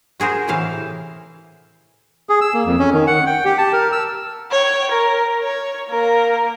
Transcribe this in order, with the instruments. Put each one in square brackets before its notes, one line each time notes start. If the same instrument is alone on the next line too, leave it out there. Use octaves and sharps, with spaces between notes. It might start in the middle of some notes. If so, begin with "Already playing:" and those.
[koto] F#4 G#4 A#4 C5
A2 C3 E3 E4 F5
[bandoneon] G#4
E6
A#3
F2
C#4
D#3
F#5
G5
G4
A5
A#4
E6
[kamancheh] C#5 G5
A#4
C#5
A#3 A#4